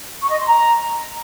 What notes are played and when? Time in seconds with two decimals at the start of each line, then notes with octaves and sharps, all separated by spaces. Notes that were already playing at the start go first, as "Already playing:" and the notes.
0.21 C#6
0.29 D#5
0.38 C6
0.46 A#5